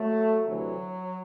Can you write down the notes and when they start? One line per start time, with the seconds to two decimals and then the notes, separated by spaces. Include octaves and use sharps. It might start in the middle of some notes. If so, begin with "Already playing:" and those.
Already playing: F#3 A3
0.48 D2 C3 E3 F#3